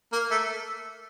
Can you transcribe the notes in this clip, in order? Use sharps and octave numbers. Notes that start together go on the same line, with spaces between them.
A#3
A3